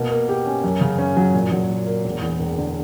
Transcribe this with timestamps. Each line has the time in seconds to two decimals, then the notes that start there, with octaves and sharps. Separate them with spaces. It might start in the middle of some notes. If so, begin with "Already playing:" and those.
Already playing: B2 A#3
0.10 A#3
0.29 G4
0.46 C#4
0.64 F#2
0.81 C#3
0.98 C#4
1.17 F#3
1.34 A#2
1.52 F#3
1.70 A#2
1.87 A#3
2.04 E1
2.22 E2
2.40 E1
2.58 D3